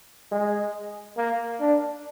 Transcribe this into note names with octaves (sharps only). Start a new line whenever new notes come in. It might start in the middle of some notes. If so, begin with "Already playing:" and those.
G#3
A#3
D4